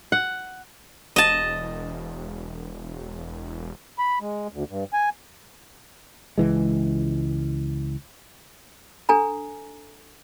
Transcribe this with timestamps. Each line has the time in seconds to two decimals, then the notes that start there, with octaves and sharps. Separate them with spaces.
0.12 F#5
1.16 E1 D#5 A5
3.98 B5
4.21 G#3
4.52 D2
4.70 G2
4.93 G#5
6.38 C#2 E3 G#3
9.09 D4 A4 G#5 A#5